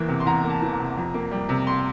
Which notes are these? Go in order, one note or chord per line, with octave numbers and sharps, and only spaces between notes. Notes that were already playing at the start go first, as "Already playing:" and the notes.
Already playing: E2 E3 A#3
C3
C6
E2 A#5
A#3
A5
E3
A#5
C3
F2
A#3
G3
C3
C6